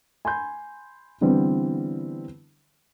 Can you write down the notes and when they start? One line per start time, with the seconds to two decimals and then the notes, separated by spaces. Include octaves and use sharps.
0.25 G#5 B5 C6 G6
1.21 D3 E3 G3 B3 C4